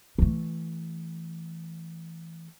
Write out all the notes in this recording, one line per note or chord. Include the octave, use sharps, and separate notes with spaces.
E3 A3